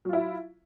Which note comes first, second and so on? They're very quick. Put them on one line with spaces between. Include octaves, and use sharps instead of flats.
F#3 F4 E4